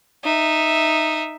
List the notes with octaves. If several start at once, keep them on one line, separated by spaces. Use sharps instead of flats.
D#4 E5